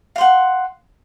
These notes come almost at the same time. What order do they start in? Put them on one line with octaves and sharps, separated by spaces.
F5 C6 F#5